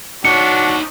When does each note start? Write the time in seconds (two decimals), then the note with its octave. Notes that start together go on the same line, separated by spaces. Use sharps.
0.25 D4 D#4 F#4 C#5 C#7